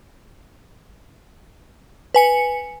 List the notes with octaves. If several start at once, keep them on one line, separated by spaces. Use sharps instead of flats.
B4 G#5 C#7